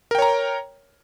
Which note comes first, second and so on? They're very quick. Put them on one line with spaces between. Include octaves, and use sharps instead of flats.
A#4 G5 C#5 A#5